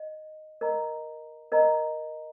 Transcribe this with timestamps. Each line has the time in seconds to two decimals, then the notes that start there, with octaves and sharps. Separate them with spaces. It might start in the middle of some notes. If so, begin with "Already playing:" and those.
Already playing: D#5
0.61 A#4 D#5 A#5
1.52 A#4 D#5 A#5